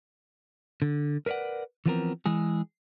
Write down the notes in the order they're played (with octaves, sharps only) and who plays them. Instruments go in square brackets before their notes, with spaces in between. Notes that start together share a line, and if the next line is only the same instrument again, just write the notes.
[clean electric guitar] D3
A#4 B4 C#5 D5 F#5
E3 F3 B3 C4 A4 A#4
E3 G#3 G#4